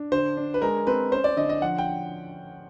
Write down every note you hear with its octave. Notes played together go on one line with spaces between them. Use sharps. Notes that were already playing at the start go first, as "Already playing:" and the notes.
Already playing: D4
D3 C5
D4
B4
G#3 A#4
C4 B4
C#4 C5
D5
D3 D#5
D#5
F3 F#5
G5